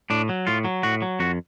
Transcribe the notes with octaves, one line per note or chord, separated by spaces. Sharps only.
A2 D4
F#3
A2 F4
F#3
A2 F#4
F#3
F2 F#4